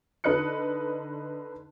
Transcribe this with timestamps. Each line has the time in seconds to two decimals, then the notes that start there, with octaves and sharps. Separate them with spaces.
0.24 D3 D#4 B4 D#5 F#6 C#7